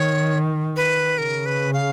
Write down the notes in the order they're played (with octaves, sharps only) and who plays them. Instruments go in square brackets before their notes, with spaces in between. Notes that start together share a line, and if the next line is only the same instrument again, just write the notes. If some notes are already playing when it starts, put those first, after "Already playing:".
Already playing: [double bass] D#3 [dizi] C#5
[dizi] B4
[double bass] C#3 [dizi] A#4
[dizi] B4
F5